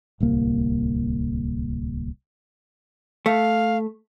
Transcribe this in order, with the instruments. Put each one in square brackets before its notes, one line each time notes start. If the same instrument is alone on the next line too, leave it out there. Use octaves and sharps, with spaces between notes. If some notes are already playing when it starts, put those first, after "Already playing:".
[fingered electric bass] D1 C2 A#3
[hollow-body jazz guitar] A3 [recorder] F5